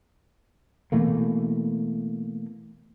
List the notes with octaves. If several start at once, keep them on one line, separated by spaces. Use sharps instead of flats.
B2 E3 A3 A#3